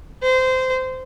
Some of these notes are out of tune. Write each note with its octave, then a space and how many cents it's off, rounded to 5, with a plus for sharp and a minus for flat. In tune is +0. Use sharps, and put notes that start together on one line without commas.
C5 -20